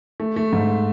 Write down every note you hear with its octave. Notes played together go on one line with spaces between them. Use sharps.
A3
A3
G#2